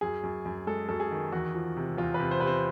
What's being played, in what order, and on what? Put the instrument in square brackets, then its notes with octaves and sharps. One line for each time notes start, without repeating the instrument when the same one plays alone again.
[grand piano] F#2 G#4
F#2
F#2
G#3 A4
F#2 A4
G#4
D#3
E2 F#4
F3
C3
E2 F4
B4
C3
C5
C3 B4
C5